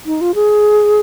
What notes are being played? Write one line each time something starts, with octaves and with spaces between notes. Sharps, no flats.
D#4
F4
G#4